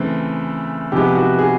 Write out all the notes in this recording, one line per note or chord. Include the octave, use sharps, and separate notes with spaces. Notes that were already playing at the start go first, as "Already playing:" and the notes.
Already playing: C#3 E3 A3 C4
C3 F3 G#3 B3 G4
F#4
G#4